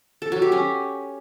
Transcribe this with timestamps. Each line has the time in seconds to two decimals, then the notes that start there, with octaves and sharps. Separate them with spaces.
0.22 A4
0.32 F#3
0.42 G4
0.52 C#4